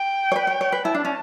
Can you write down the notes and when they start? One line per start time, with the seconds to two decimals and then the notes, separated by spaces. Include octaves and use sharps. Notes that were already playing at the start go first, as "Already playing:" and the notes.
Already playing: G5
0.32 C#5
0.36 B4
0.47 C#5
0.61 C#5
0.72 B4
0.85 E4 A5
0.95 D4
1.05 C#4